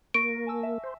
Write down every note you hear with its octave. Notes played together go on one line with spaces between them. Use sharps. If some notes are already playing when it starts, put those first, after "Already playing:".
A#3 C#6 A#6 D7
G#5 A5 E6
E5
C5